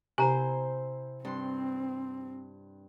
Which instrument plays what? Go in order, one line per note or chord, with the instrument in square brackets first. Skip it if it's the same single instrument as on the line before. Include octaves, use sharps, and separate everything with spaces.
[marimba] C3 G4 [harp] C4 E4 C5 [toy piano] G#5 A#5
[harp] G2 C6 [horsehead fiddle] C4